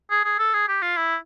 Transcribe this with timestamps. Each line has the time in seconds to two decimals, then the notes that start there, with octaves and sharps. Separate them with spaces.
0.11 G#4
0.24 G#4
0.39 A4
0.53 G#4
0.68 G4
0.82 F4
0.96 E4